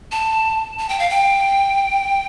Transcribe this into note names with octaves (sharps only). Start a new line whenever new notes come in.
A5
A5
G5
F5
G5